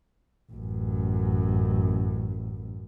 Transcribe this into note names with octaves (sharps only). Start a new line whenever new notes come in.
A1 F#2